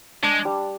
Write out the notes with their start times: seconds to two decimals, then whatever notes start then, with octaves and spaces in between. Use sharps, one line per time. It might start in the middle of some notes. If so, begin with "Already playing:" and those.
0.23 G#3 D4
0.45 G3